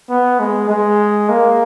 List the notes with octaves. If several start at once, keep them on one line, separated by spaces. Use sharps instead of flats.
B3
G#3
G#3
A#3